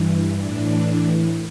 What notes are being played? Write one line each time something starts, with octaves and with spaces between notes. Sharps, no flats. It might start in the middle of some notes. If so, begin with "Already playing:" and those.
Already playing: G2 E3
A2 E3 D4